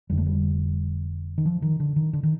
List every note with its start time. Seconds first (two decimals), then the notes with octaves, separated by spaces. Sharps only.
0.09 F1 F2 D3 G3
0.18 A3
0.26 G3
1.38 D#3
1.46 F3
1.62 D#3
1.80 D3
1.96 D#3
2.13 D3
2.23 D#3